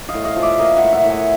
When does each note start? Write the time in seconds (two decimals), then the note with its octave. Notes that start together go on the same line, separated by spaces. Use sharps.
0.09 D#5 F5
0.14 A2
0.25 D#5 F5
0.36 F3
0.42 D5 E5
0.59 A#3 D#5 F5
0.77 E5 F#5
0.83 A2
0.93 E5 F#5
1.04 A2
1.10 F#5 G#5